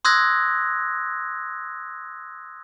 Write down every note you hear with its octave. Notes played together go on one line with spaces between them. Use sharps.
C6 D#6 E6 F#6 G#6 A#6